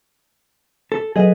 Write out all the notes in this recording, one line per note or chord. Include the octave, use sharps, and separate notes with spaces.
A4
F#3 G#4 A4 B4 D#5